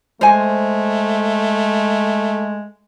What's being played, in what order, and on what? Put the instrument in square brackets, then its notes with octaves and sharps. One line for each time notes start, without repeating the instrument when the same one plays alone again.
[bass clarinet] G#3 [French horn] A3 [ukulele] C5 G#5